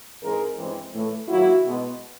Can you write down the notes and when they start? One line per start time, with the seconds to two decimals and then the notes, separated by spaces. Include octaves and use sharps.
0.22 G#2 E3 G#3 C4 G#4 A#4
0.58 G2 E3 G#3 C4
0.94 A2 E3 A3
1.29 G#2 D#3 F#3 A#3 E4 F#4
1.65 B2 G#3 B3